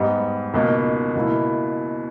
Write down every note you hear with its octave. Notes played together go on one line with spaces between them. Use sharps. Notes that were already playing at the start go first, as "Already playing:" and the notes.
Already playing: G#2 G3 B3 D#4
C#2 B2 A#3 D#4
C#2 B2 A#3 E4